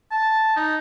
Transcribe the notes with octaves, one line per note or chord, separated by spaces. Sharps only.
A5
D#4